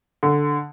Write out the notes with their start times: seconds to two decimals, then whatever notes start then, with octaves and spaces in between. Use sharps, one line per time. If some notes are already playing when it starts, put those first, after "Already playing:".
0.23 D3